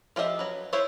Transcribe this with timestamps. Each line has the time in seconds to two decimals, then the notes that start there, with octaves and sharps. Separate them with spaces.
0.16 F3 F4 G4 D#5 E5
0.39 F#3 B4
0.73 E4 F4 C5 C#5 E5